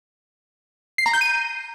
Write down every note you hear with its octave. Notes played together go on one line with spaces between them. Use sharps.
C7
A#5
G6
D#7